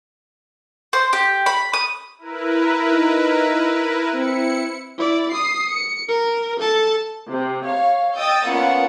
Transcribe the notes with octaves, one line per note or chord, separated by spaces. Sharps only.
C5
G4
B5
D#6
E4 A#4 B4
D#4
C4 E4 C#7
E4 D5
D#6 C7
C#7
A#4
A4 A5
C3
C#5 F5
D#5 G5 D#6 E6 G6 A6
A#3 B3 C#4 F4 D5 F#5